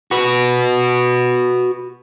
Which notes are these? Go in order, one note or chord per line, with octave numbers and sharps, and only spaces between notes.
F#4 B4